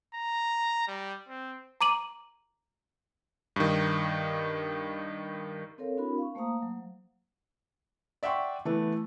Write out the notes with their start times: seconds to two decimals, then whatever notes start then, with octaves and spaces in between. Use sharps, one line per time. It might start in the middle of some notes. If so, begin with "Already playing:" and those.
0.14 A#5
0.88 G3
1.29 C4
1.81 A#5 D6 D#7 F#7
3.56 G2 D#3
5.78 C4 A4 A#4 C#5 F5
5.97 C4 D4 E4 F#4 A#4 B5
6.18 F5 C#6
6.35 A3 A#3 C5 F5 A#5 D#6
6.62 F#3
8.23 D5 E5 F#5 G5 C6 C#6
8.65 E3 A3 B3